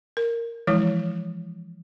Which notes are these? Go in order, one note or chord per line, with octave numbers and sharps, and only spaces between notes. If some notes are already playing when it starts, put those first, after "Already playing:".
A#4
E3 F3 G#3 E4